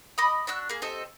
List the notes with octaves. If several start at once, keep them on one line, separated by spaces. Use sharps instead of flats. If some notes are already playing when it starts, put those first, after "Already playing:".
D#5 B5 D6 D#6
D4 F#4 E6 F#6
A#3 G#4
C4 G4 A4 D#5